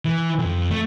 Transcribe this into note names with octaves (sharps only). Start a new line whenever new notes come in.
E3
F2
A3